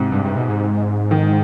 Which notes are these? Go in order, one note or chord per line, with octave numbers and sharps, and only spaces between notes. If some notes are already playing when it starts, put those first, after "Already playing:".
Already playing: G#2 C3
G2
G2
B2
G#2
D#3